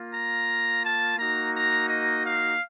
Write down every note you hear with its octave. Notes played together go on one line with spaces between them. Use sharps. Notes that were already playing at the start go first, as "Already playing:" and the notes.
Already playing: A#3 F4
A#5
A5
A#3 D#4 F#4 A#5
A#5
D#5
F5